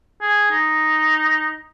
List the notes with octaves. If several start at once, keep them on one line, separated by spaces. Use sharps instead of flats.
G#4
D#4